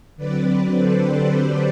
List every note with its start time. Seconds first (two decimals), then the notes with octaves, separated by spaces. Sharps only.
0.16 D3 F#3 C4 B4 D5
0.76 A4 C5
1.07 G4